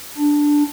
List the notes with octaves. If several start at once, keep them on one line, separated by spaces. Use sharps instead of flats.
D4